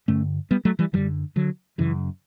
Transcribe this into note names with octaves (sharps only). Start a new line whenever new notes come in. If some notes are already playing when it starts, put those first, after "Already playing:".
G2 D3 A3 C#4
G3 B3
F#3 A3
E3 G3
F#2 D3 E3 G3
D3 F#3
F#2 C#3 E3